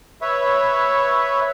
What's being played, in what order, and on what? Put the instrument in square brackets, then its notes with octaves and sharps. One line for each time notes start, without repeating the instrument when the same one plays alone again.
[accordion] B4 C#5 E5